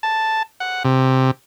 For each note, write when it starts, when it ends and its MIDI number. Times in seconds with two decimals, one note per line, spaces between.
0.03 0.43 81
0.60 0.83 78
0.85 1.31 48